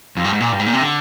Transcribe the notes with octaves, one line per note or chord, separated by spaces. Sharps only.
F2
G2
G#2
A#2
G2
G#2
A#2
C3
D3